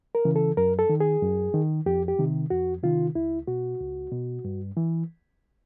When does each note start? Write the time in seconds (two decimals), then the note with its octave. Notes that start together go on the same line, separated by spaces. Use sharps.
0.15 A#4
0.25 C#3 E3
0.36 A4
0.57 F#2 A#4
0.79 A4
0.89 D#3
1.00 G#4
1.22 F#2
1.54 D#3
1.86 F2 G4
2.08 G4
2.19 C3 D#3
2.50 F2 F#4
2.83 C3 D#3 F4
3.15 C#2 E4
3.47 B2 F#4
3.80 C#2
4.12 B2
4.45 G2
4.77 E3